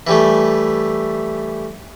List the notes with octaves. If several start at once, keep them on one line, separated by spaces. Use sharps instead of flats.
E3 G3 A3